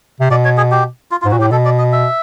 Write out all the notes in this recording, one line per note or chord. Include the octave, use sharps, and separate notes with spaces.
C3
B2 D5
C#5
G#4
G4
F4
F4
G#2
A#2 F#4
A2 G4
B2 A4
D5
D#5
E5